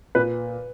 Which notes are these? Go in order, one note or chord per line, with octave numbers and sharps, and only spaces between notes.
A#2 B4